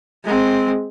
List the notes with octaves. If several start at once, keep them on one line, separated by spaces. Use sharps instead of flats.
G#3 C4